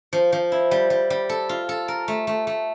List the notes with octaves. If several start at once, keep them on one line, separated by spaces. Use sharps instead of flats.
F3
F3
E4
G3
G3
G3
A4
F4
A4
A#4
A3
A3
A3